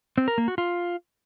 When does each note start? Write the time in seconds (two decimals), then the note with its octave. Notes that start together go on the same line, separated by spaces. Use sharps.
0.18 C4
0.28 A#4
0.38 A#3
0.48 F#4
0.58 F4